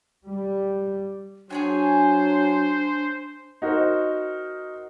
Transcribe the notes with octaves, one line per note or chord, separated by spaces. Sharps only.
G3
F#3 D4 G#4 C5 C#5 G#5
D#4 F#4 A#4 C5